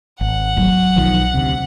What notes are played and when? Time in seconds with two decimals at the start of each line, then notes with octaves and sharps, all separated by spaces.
0.21 G#1 F#5
0.57 F#3
0.96 B1 D#3 F3
1.34 D2 C3